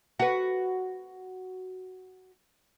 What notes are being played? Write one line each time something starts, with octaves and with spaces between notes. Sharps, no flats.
F#4 B4